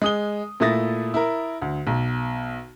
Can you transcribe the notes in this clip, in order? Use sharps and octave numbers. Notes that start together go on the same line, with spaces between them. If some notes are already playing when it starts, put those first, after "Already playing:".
G#3 D#6 G7
A#2 A3 E4 D#6 A6 A#6
E4 A#4
D2
B1